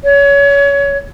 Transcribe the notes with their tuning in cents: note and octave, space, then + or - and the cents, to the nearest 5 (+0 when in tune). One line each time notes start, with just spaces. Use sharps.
C#5 +25